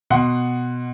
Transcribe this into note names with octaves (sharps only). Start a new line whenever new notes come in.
B2 F#5 C6